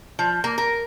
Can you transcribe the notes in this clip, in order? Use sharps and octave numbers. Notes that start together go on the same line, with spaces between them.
F3
A#3
A#4